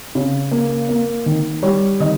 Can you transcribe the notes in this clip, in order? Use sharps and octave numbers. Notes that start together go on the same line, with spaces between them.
C#3
A#3
A#3
D#3
G3 C#5
D#3 D#5